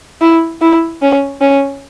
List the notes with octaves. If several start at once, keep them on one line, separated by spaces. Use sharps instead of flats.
E4
E4
C#4
C#4